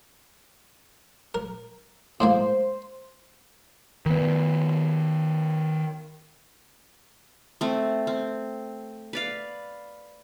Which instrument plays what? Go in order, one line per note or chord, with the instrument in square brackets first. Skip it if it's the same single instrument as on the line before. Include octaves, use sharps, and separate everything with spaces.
[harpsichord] A#4
[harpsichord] A2 G#3 A#3 [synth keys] C5
[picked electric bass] D#3 B3
[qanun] A3 C4
C4
B4 D5 F5